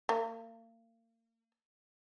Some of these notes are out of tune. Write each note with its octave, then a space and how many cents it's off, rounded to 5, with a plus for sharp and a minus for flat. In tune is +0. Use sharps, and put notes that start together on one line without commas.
A#3 -35